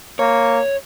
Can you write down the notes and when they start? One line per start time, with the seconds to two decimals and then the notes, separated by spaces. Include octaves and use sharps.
0.19 A#3 C#5